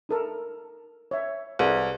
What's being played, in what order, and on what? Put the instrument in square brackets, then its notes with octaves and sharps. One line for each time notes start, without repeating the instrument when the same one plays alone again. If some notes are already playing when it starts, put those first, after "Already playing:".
[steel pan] D#4 A4 A#4
C#5 E5
[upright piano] C2 [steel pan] G#4 A4 B4